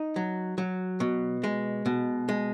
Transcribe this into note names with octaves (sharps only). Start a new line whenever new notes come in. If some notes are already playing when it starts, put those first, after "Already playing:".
Already playing: D#4
F#3
F#3
B2
G#3
B2
G#3